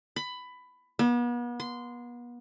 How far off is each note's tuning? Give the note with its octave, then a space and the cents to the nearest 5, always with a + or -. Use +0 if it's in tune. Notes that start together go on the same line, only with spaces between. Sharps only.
B5 +15
B3 -40
C6 -15